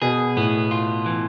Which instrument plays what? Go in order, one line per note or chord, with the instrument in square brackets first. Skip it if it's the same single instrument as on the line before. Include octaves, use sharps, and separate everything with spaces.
[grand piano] B2 [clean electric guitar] G#4
[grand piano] A2 [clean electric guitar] B3
[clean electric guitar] F4
E3